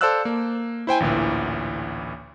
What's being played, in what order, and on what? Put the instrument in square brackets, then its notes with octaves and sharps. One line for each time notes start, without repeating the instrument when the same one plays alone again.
[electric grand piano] A4 C5 D5 F5 E6 F#6
A#3
E4 C5 G5 G#5
A1 D2 A#2 E3